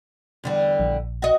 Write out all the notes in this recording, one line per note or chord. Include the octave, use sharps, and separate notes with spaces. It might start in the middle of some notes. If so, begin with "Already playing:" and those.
E2 D3 G3
A#1
F#4 D#5